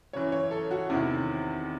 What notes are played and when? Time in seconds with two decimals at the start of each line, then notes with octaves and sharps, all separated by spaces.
0.13 F#2 C#3 E3 C#5
0.32 C#5
0.51 A4
0.71 F#4
0.90 E2 C3 D#3 E4